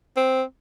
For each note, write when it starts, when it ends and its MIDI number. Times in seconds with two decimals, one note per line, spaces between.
0.17 0.43 60